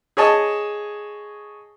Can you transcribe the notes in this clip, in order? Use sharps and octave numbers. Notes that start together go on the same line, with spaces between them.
G#4 C#5 D#5 A5